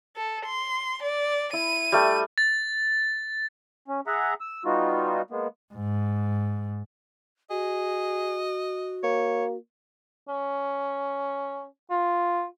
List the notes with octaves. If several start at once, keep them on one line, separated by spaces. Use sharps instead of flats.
A4
C6
D5
E4 D#7
G3 A3 B5
A6
C#4
G#4 E5 F#5 A#5
E6
G3 B3 D#4 F4 F#4
G#3 A#3 B3
G#2
F#4 G#4 D#5
A#3 C#5
C#4
F4